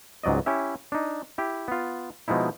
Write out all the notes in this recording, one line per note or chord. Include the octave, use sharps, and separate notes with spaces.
C#2 G#2 F#3 D5 D#5
C#4 E4 G4 E5
D4 D#4
E4 G4
B3 F4
B2 F3 G#3 D#4 E4